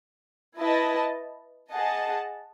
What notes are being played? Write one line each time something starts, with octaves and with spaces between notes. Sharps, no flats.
E4 B4 D#5 A5
G#4 D#5 F#5 A5